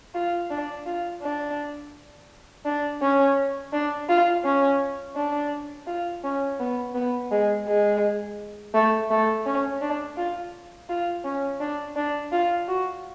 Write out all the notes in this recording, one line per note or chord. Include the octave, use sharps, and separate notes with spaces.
F4
D4
F4
D4
D4
C#4
D4
F4
C#4
D4
F4
C#4
B3
B3
G#3
G#3
A3
A3
C#4
D4
F4
F4
C#4
D4
D4
F4
F#4